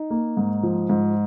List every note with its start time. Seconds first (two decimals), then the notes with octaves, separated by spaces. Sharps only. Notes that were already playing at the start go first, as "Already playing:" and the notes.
Already playing: D#4
0.10 A#3
0.37 G#2
0.63 F3
0.90 G#2